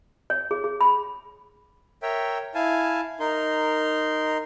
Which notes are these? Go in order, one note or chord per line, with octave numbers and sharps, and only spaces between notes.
C#5
G#4
G#4
B5
A#4 C#5 E5 G5
E4 F5 G#5 A5
D#4 A#4 C6